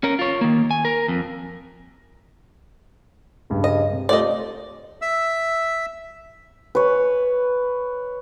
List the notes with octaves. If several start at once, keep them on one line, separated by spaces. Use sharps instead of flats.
C#4 A#4
F4 C#5
D#3 A#3
G#5
A#4
F2
C#2 G2
D#5
C3
A3 F4 G4 D5 D#5
E5 E6
B4 C#5